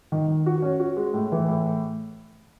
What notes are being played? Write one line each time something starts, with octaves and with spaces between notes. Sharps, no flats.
D#3
D#3
F#4
C#4
F#4
G#3
A2
E3
A2